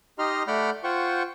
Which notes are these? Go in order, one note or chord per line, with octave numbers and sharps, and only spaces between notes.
D#4 G4 D#5 A#5 C6 F6
A3 D5 F#5 B5 F6 G6
F4 C5 F#5 G5 C#6